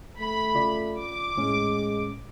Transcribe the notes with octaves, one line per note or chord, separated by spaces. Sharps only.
A3 B5
C#3 F4 D5
D6
A2 G#3 C#4